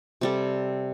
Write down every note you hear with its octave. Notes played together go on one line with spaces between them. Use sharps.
C3 G3 A4